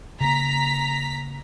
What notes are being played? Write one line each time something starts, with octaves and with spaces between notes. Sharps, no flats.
C#3 A#3 A#5 B6